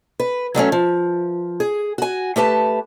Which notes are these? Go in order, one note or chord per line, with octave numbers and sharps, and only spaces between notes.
B4
F#3 G3 A3 C#4
F3
G#4
F#4 G#5
A3 G4 B4 A5